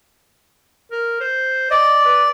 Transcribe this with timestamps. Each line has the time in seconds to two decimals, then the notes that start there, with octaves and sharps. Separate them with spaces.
0.92 A#4
1.21 C5
1.71 D5 D#5
2.05 B4